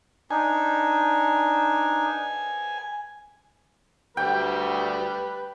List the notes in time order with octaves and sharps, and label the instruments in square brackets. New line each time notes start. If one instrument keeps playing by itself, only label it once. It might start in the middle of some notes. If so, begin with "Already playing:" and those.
[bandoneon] D4 D#4 [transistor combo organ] G#5
[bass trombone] D2 [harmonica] G3 B4 [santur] G5